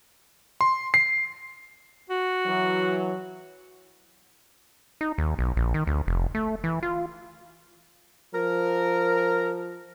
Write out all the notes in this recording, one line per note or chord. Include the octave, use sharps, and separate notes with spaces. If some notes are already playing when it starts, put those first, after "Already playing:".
C6
C7
F#4
E3 F#3
D#4
D#2
B1
A#1
D#3
D2
F1
A3
E3
F4
F3 A#4